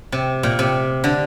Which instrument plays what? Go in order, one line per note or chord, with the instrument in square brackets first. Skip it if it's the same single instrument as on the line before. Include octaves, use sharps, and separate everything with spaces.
[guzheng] C3
A#2
C3
D3